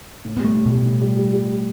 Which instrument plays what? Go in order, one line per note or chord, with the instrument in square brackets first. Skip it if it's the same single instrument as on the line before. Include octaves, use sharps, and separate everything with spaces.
[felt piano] A2
[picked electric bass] B3
[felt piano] G3
[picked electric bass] A3
[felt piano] A2
[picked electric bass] B2 [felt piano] G3
[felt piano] A2
G3
G3
G3